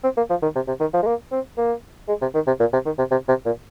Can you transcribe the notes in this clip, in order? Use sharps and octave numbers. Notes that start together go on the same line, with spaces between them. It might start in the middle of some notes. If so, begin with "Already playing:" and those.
C4
A#3
F3
D#3
C3
C3
D#3
F3
G#3
A#3
C4
A#3
G#3
C3
D#3
C3
A#2
C3
D#3
C3
C3
C3
A#2